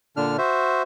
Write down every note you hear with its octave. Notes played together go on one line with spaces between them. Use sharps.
A#2 D3 D4 F6
F#4 C5 E5